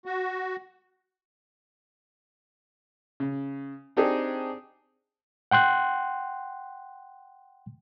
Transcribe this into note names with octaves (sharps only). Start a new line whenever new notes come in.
F#4
C#3
C4 D4 D#4 G4 G#4
F#5 G5 C6 F#6